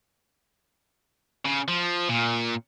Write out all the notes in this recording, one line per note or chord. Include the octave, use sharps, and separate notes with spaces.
C#3
F3
A#2